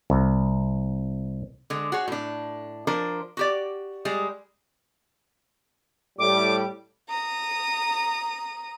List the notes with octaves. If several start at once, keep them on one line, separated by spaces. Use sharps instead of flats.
C2
D3 G#3
F#4 G#4 C#5
A2 D4
F3 D4 A#4 C5
F#4 G4 D5
G3 G#3 G#4
A2 G3 D6
A#5 D#6